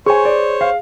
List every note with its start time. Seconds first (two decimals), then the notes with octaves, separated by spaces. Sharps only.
0.06 G#4 C5 C#5 G#5 C#6
0.25 D5
0.61 F5